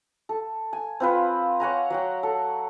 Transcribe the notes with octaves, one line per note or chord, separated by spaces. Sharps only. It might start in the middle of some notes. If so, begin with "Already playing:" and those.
A4
G#5
C4 F4 B4
C#5 F#5 G#5 A#5
F#3 F#5 G5
A4